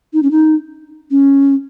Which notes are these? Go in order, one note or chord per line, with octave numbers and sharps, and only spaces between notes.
D#4
C#4
D#4
C#4